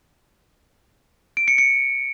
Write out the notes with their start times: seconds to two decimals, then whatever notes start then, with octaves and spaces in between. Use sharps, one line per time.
1.37 D7
1.48 C#7
1.58 C#7